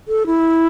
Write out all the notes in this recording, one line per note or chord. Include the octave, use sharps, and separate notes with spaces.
A4
E4